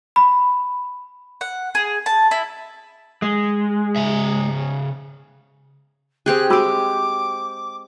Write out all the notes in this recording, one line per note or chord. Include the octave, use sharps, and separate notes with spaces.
B5
F#5
G#4
A5
E4
G#3
C#3 E5
C4 G4 G#4 F#6
G#3 F#4 G4 B5 D6 E6